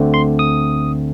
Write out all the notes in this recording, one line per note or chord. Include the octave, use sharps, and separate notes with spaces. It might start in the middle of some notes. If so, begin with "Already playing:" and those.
Already playing: D2 D3 A3 C4
C6
D#6